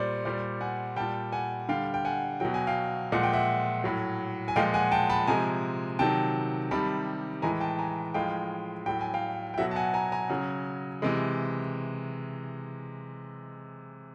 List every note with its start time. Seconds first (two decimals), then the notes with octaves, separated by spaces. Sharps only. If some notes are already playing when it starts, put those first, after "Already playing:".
Already playing: A#2 G3 C5 D5
0.25 A#2 G3 C5 D5
0.61 F#5 G#5
0.96 A#2 G3 G5 A5
1.32 F#5 G#5
1.69 D3 G3 F5 G5
1.94 G5
2.05 F#5 G#5
2.40 B2 F#3 G5
2.54 G#5
2.67 F5 G5
3.12 A#2 F3 G#3 F#5
3.23 G5
3.33 E5 F#5
3.84 A2 F#3
4.48 G#5
4.56 A#2 F3 G#3 F5 G5
4.74 F#5 G#5
4.92 G5 A5
5.10 A5 B5
5.27 C3 F3 G#3 G#5 A#5
5.99 C3 D#3 F#3 G5 A5
6.71 C3 D#3 G3 A5 B5
7.42 A2 E3 G#3 G#5 A#5
7.60 G5 A5
7.78 G#5 A#5
8.14 A2 F3 G#3 F5 G5
8.86 A2 F#3 G5
9.01 G#5
9.14 F5 G5
9.54 G5
9.58 B2 F#3 E5 F#5
9.71 A5
9.76 F#5 G#5
9.94 G#5 A#5
10.12 G#5 A#5
10.29 C#3 F#3
11.02 C3 E3 G#3